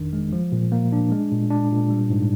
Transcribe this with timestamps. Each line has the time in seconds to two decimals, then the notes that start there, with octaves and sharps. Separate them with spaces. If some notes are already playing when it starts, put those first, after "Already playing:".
Already playing: G1 F2 D#3 D4
0.13 G#3
0.33 F3
0.52 A#2
0.72 A#3
0.93 D4
1.11 G#3
1.32 A#2
1.50 D4
1.71 A#2
1.90 G3
2.10 G#2